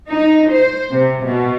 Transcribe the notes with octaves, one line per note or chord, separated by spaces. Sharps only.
D#4
C5
C3
B2